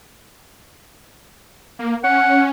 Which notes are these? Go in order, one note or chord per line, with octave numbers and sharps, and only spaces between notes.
A#3
C#4 F#5